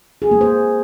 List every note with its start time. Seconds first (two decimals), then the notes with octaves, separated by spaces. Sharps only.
0.22 G#4
0.31 A#3
0.41 C5